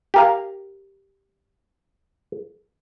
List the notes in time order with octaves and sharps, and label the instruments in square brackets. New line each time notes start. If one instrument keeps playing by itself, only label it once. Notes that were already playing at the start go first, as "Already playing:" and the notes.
[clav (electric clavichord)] G4 A#4 F5